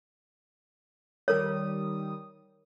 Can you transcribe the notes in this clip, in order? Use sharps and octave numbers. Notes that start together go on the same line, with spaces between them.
D#3 G3 A#4 C#5 D#6